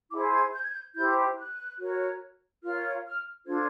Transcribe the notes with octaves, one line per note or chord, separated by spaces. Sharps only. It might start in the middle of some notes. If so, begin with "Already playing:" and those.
E4 G#4 C5 D6
G#6
G6
G#6
G6
E4 G4 C5 G6
F#6
F#4 A#4 C#5
F4 A#4 C#5 F6
F6
D4 F4 A4 C5 G#6